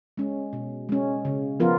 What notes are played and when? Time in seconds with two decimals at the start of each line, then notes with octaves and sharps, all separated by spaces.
0.17 G#3 C#4
0.53 B2
0.89 G#3 C#4
1.25 C#3
1.60 F3 B3 F4 A#4